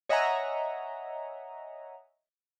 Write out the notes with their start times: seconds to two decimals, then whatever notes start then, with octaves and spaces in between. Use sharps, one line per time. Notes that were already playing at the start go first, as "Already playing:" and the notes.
0.09 C#5 D#5 E5 F#5 G#5 A#5